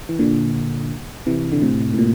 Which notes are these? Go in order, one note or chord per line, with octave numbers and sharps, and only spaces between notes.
E3
A#2 D3
C3 E3
D3
A2 C3
A2
A#2